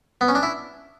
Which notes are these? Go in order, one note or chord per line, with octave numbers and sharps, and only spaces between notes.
B3
C#4
D4
E4